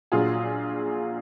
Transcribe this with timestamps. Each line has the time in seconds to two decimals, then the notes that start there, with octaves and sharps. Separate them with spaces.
0.12 A#1 A#2 F#3 F4 G#4